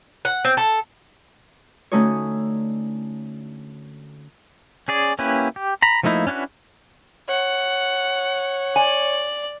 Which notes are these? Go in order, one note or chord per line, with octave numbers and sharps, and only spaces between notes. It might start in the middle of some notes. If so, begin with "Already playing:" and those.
F#5
C4
A4
D3 A3 C#4 D#4 F#4 C#5
C#4 G#4 D5
A#3 C#4 E4 G4 B4
G4
A#5 B5
F3 A3 A#3 D#4 E4
C#4 D4 E4 F#4 B4
C#5 F#5
D5 G#5